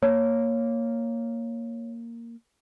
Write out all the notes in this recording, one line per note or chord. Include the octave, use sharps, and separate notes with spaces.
A#3 C#5